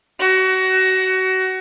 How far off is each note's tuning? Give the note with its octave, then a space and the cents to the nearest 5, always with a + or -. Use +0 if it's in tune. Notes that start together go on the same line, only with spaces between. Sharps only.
F#4 +25